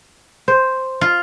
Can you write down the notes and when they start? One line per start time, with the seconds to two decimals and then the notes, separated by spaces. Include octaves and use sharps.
0.48 C5
1.01 F4